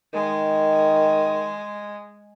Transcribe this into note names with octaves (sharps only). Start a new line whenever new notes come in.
D#3 G#3